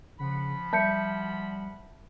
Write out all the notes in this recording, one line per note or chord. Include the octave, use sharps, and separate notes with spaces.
C#3 F3 F#5 B5
G3 E5 A5 G6 C#7